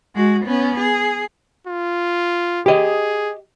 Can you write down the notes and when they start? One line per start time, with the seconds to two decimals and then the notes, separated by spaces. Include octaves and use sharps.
0.15 G#3 F#4
0.45 B3 C#4
0.79 G#4
1.68 F4
2.66 G4 G#4 D#5